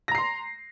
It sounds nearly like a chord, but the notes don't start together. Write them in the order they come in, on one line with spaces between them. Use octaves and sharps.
A#6 A#5 C7 C6